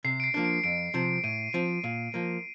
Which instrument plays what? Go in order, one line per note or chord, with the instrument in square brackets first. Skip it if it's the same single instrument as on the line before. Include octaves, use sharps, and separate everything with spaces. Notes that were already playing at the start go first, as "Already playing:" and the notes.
[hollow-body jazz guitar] C3 [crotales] C7
[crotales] D7
C7
[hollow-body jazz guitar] F3 A#3 D4
[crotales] D7
[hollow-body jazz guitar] F2 [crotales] D7
[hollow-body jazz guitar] C3 F3 C4
[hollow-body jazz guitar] A2 [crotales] D#7
[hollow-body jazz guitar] F3 C4 [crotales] D7
[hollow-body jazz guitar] A#2
F3 A#3